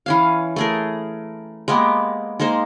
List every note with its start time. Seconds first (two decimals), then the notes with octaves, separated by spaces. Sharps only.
0.06 E3 C#4 F5
0.56 A3 G#4 A#4
1.68 G#3 A#3 B3 G4
2.40 G#3 A#3 D#4 C5